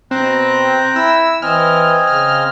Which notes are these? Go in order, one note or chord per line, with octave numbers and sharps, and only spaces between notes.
B2 C4 G5 A#5 F#6
E4 E6
E3 C4 D#5 G#5 F6
C#3 F6